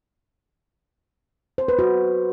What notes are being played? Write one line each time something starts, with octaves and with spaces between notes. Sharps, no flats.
C5
B4
F#4